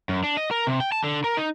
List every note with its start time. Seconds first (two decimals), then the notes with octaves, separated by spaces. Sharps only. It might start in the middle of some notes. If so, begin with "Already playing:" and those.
0.09 F#2
0.24 D4
0.37 D#5
0.51 A#4
0.67 C3
0.80 G5
0.92 A5
1.04 D3
1.24 A#4
1.37 D#4